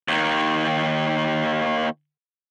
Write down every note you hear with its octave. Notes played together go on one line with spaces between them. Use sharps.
D#2 D#3